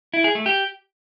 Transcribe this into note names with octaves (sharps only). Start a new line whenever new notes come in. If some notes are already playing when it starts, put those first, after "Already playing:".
E4
G#4
A3
G4